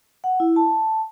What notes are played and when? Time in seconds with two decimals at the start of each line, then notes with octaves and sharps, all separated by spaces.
0.24 F#5
0.40 E4
0.56 A5